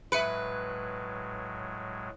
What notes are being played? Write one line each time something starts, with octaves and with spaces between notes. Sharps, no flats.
A2 F#3 G#3 B4 E5 C#7 D7